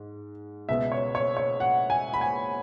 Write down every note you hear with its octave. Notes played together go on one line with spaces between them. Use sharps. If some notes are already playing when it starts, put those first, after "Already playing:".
Already playing: G#2
C#2 B2 B3 E5
C#5
C#5
C#5
F#5
G#5
B5
G#5